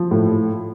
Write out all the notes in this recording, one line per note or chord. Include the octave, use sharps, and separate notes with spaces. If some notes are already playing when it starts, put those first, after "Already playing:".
Already playing: F3
A2